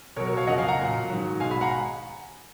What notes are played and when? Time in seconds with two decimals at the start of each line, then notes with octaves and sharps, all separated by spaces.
0.16 B2 A#4 C#5
0.20 F#3
0.27 A#4 C#5
0.37 C#5 F5
0.47 F2 C#3 F3 D#5 F#5
0.58 F5 G#5
0.68 F#5 A#5
0.79 A#2 F#3
1.10 G#2 D#3 F#3
1.40 B2 G#3 F5 G#5
1.51 G#5 B5
1.61 F#5 A#5